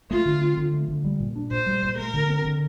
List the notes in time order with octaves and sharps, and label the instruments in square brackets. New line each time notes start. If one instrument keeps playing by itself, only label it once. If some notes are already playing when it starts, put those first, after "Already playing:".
[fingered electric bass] A3 [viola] F4
[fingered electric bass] D3
C4
D3
A3
D3
G3
A#2
D4
[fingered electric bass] A#2 [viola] C5
[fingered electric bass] G3
A#2
[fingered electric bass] A3 [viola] A#4
[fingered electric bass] D3
C4
D3